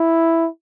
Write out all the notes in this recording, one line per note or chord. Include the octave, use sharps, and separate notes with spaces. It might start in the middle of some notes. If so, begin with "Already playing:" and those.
Already playing: E4